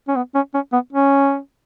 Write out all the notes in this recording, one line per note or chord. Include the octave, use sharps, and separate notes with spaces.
C#4
B3
C#4
C#4
B3
C#4